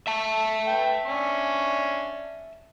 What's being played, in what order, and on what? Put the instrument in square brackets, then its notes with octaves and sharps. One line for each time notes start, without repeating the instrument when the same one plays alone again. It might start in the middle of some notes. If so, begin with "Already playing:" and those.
[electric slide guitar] E5 A5
[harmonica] B4 G5
C#4 D4 C#6